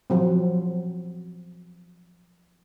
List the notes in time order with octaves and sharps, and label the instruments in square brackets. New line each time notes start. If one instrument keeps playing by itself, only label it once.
[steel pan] F3 F#3 C4